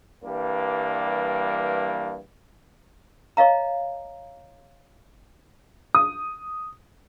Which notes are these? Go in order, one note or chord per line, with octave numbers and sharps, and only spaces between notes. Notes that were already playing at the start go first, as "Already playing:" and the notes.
G2 E3 G3 A#3
C#5 D#5 F5 A#5
D#6